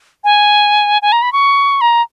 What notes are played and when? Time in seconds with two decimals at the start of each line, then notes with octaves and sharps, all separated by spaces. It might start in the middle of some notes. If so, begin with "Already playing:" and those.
0.24 G#5
1.02 G#5
1.12 A#5
1.22 B5
1.33 C#6
1.81 A#5